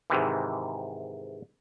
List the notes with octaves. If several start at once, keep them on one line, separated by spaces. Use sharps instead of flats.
G#2 C3 D#3 E3